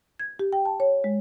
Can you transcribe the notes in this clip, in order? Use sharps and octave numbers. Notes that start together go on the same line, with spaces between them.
G#6
G4
G5
A5
C#5
G#3